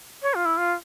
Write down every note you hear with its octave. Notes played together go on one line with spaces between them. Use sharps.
C#5
F4
E4
F4